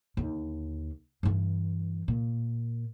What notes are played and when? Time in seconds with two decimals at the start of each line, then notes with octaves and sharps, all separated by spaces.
0.17 D#2 D3
1.23 G2 E3
2.08 A#2